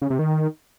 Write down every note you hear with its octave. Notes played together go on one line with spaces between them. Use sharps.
C#3
C3
D#3